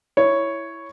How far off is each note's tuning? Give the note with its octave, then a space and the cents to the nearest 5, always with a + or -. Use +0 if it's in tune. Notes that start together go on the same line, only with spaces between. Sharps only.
E4 +0 C#5 +0